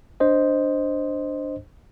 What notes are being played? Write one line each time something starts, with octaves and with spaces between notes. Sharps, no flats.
D4 C5 D#5